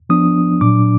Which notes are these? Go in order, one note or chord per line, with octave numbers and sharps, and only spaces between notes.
F3 B3 D4 D#6
A#2 F#3 D4 D6